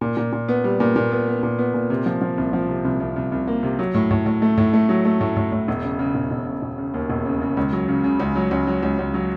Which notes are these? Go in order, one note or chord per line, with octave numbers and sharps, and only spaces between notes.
A#2
A#2
A#2
B3
G3
A#2
A#2
B3
B3
A#2
B3
A#2
C3
F3
F3
C2
F3
C3
C2
C2
C2
C2
A#3
C3
F#3
A2
A2
A2
A3
A2
A3
F#3
A3
A2
A2
A2
E1
C#3
C#3
E1
E1
C#3
E1
C#3
D#2
E1
C#3
C#3
C#2
F#3
C#3
C#3
C#2
F#3
C#2
F#3
C#2
C#2
F#3